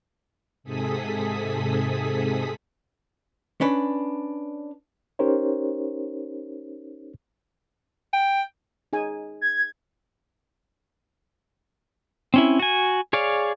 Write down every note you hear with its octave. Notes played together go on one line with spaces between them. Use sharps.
G#2 C3 G#4 A4 D#6 B6
C#4 D4 B4
C#4 D#4 G4 A#4 C5 C#5
G5
D#4 G#4 G#5
G#6
C4 C#4 E4
F#4 G#5
G#4 C#5 D5 F5